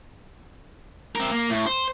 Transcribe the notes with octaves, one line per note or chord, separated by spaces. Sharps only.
C4 A#4
A#3
A2
C5